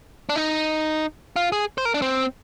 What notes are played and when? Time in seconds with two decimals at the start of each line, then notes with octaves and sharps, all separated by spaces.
0.29 D4
0.36 D#4
1.36 F4
1.52 G#4
1.78 C5
1.85 A#4
1.94 D4
2.02 C4